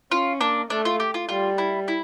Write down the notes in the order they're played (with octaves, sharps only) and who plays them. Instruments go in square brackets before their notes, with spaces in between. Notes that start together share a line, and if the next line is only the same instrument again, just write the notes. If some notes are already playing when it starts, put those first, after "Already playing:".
[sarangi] C#4 [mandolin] F4
[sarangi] A#3 [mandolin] D4
[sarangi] A3 [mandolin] D4
[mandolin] F4
G4
F4
[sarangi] G3 [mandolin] F4
[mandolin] E4
E4